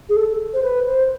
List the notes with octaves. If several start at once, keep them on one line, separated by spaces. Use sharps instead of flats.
G#4
A4
C5
B4
C5